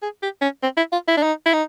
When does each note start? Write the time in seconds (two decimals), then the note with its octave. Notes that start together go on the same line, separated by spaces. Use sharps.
0.02 G#4
0.23 G4
0.42 C#4
0.63 C4
0.77 E4
0.92 F4
1.08 E4
1.17 D4
1.23 D#4
1.46 E4
1.53 D#4